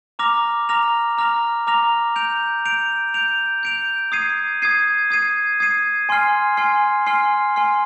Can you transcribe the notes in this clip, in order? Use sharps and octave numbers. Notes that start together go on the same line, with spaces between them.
A#5 D6 F6 A#6 F7
A#5 D6 F6 A#6 F7
A#5 D6 F6 A#6 F7
A#5 D6 F6 A#6 F7
G6 D7 F7
G6 D7 F7
G6 D7 F7
G6 D7 F7
D#6 G#6 C7 D#7
D#6 G#6 C7 D#7
D#6 G#6 C7 D#7
D#6 G#6 C7 D#7
G#5 C6 F6 C7
G#5 C6 F6 C7
G#5 C6 F6 C7
G#5 C6 F6 C7